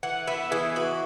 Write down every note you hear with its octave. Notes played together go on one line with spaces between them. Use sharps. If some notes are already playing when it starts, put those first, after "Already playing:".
E3 F#5
B3 E5
E3 G#4
F#4